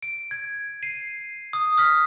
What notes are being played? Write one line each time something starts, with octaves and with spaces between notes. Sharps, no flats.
D7
G#6
C7 D#7
D#6
D#6 F6 B6